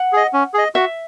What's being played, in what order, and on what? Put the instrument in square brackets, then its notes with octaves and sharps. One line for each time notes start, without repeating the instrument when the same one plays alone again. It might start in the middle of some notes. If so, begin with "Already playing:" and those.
Already playing: [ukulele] F#5
[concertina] G#4 D#5
C#4
G#4 D#5
[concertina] F#4 [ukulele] E5